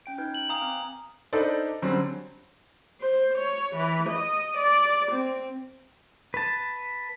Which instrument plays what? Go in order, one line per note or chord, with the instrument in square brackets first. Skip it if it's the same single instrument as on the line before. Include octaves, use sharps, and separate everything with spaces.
[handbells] C#4 G5 D7
D#4 B4 G6
[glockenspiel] F#7
[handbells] F5 G5 G#5 [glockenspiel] A#5 D#6
[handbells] C4 F6
[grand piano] D4 D#4 A4 B4 C5 D5
D3 F#3 G3 C4 C#4
[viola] C5
C#5
E3
D#5
D5
C4
[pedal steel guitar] B4 A5